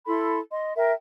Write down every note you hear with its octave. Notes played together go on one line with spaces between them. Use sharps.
E4 A4 B5 C6
D#5 C6
A#4 E5 G5